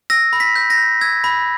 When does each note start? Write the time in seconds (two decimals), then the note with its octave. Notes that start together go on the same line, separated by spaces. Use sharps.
0.10 E6 A#6
0.33 B5
0.40 B6
0.55 G6
0.70 A#6
0.78 G6
1.01 E6 G#6
1.24 B5